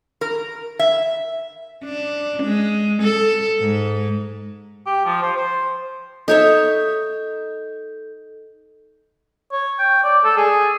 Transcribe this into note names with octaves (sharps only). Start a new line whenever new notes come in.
A#4
E5
D4
G#3
A4
G#2
G4
F3
C5
C5
D#4 A4 C#5 E5 G6
C#5
G5
D5
A4
G#4